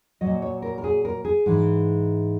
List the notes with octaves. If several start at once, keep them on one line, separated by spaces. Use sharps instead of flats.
A#2 F#3 D#5
C#5
A#4
A#4
G#4
A#4
G#4
G#2 E3